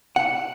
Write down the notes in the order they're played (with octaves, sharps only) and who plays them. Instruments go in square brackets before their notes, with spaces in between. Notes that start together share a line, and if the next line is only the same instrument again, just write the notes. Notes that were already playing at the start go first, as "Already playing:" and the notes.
[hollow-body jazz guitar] F#5